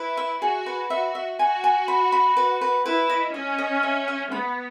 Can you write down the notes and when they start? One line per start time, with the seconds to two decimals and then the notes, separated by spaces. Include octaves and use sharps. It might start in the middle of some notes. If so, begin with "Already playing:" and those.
Already playing: E4 B4
0.17 E5
0.41 F#4 G#4
0.66 B4
0.90 F#4 E5
1.15 E5
1.39 F#4 G#5
1.64 G#5
1.88 B5
2.12 B5
2.37 B4
2.61 B4
2.86 E4 B4
3.10 D#5
3.34 C#4 D#5
3.58 D#5
3.83 E5
4.08 E5
4.31 B3 B5